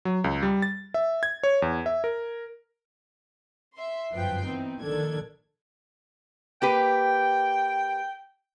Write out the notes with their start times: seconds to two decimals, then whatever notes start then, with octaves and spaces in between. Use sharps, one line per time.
0.05 F#3
0.24 C#2
0.42 G3
0.62 A6
0.94 E5
1.23 G#6
1.43 C#5
1.62 E2
1.86 E5
2.04 A#4
3.76 E5 C6
4.12 G1 F#2 F3 B4 G5 C7
4.45 E3 B3 C4 D#4
4.81 A#1 D#3 D4 A4 G#6
6.62 A#3 G4 B4 G5